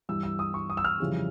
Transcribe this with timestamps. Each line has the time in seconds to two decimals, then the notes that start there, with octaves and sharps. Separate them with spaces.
0.09 G2 E3 G3 E6
0.23 E6
0.39 D#6
0.54 C#6
0.70 D#6
0.77 E6
0.84 F6
1.00 F2 C#3 E3 G3